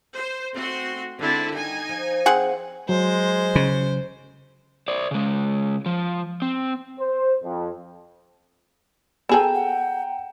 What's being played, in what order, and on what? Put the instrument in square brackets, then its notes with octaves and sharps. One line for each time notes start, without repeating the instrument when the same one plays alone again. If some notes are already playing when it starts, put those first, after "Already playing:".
[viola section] C5
[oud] A3 B3 D#4 [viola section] C4 F#4 C6
[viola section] D3 C4 E4 [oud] D#3 G#3 B3
[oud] D#3 G3 [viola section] D#4 G#5
[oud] F3
[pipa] C4 G#4 F#5
[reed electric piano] F#3 [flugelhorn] G#3 [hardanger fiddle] C5
[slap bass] C#3
[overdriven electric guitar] C5 D5
C#3 G#3
F3
C4
[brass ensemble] C5
F2
[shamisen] B3 G#4 A4 [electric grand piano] G5 A#5 E7 [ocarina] G#5
[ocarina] F#5